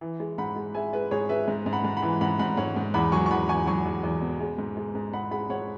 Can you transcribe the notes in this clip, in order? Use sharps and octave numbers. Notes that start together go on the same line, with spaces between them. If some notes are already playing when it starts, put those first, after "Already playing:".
E3
G#3
G#2 F#5 B5
G#3
G#3 E5 G#5
G#3 B4
G#2 G#4 C#5
G#3 B4 E5
G#2
G#2
F#5 B5
G#2
F#5 B5
E3
G#2 F#5 B5
G#2 F#5 B5
G#2 C#5 F#5
G#2
E2 F#5 B5
F#3 G#5 C#6
C#6
E2 F#5 B5
E2 G#5 C#6
F#3 G#5 C#6
E2
E2
B2
G#3
G#2
G#3
G#2
G#2 F#5 B5
G#3 F#5 B5
G#2 C#5 F#5